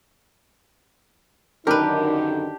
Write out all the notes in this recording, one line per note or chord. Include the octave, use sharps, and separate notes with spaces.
F#2 D3 D#3 D4 D#4 G4 A#4 B4